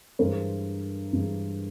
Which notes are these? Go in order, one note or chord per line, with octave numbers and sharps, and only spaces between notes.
G2 E3 G#3 A#4 C5
G2 E3 G#3